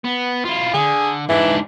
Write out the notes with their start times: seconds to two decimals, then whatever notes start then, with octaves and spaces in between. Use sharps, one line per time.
0.05 B3
0.45 E4 F4
0.73 D3 G#4
1.29 G#2 E3 D4